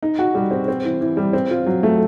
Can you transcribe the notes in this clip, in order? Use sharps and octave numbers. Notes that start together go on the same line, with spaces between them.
D#4
F#4
G3
C4
C4
E3
E3
G3
C4
F4
F#3
A3